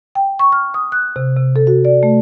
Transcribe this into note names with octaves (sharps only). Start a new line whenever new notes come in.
G5
C#6
F6
D#6
F#6
C3
C3
A4
F#4
D5
A3